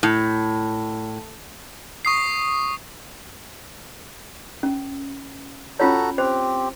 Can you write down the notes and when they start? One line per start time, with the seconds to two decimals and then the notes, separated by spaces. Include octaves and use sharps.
0.03 A2
2.05 C#6 D#6 C7
4.63 C#4
5.80 C#4 F4 F#4 A4 C#5 A#5
6.18 C4 G4 C5